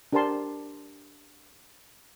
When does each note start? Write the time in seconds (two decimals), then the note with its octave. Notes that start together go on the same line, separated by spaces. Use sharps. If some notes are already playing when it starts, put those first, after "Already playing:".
0.13 D4 G4 A#4 C5 A5 C6